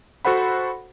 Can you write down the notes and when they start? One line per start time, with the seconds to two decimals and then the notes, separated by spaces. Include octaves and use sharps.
0.25 F#4 A4 C5 F#5 B5